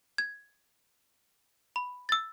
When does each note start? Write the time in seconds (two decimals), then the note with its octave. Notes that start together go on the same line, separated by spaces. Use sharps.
0.18 G#6
1.76 B5
2.09 E6 A6